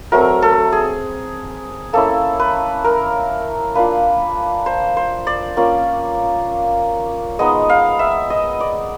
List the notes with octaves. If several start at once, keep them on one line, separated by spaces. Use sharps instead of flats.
F#3 A3 C4 A#4
A4
G#4
A#3 C#4 E4 A4
B4
A#4
A#3 D4 F4 B4
C5
C5
D5
A#3 C#4 F4
G#3 B3 D#4 D#5
F5
E5
D#5
D5